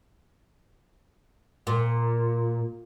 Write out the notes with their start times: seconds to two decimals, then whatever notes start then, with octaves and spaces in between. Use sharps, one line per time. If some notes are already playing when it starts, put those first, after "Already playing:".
1.67 A#2